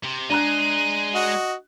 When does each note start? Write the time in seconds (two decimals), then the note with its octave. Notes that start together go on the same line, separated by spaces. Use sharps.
0.04 C3
0.30 G#3 D4 G#4 A#5 F#6 D#7
1.14 F#4 D#5